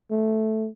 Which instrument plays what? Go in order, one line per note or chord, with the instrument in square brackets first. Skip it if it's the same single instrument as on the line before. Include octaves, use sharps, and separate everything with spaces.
[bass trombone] A3